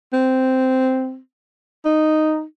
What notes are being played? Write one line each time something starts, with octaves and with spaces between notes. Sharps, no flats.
C4
D#4